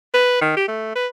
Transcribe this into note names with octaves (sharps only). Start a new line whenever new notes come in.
B4
D#3
G4
A3
B4